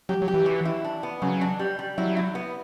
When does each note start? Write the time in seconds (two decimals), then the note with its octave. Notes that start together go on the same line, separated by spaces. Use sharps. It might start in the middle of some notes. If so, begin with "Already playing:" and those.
0.09 F#3 G4
0.22 F#3
0.28 G4
0.34 E3
0.46 F#3
0.65 E4
0.84 D4
1.03 B3
1.22 C#3 F#3
1.41 D4
1.59 G3
1.79 G3
1.98 F#3 E4
2.17 E4
2.35 B3